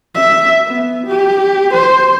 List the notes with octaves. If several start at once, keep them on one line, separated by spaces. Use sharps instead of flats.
E5
B3
G4
C5